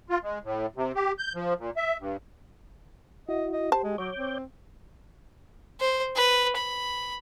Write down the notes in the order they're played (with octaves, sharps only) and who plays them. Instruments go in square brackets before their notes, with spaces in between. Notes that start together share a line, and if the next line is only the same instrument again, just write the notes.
[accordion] F4
G#3
A2
C3
G4
G6
F3
A#2
E5
G2
[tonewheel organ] E4 F#4 [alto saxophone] D#5
[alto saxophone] D#5
[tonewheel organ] G4 [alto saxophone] C5 [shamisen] A5
[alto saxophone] G#3
[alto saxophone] F#3 [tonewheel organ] C#5 D6 G6
[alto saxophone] C4
[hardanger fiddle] C5
B4
B5